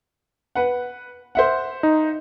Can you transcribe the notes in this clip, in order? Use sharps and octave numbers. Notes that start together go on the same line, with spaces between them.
B4 F#5
C5 E5 F#5
D#4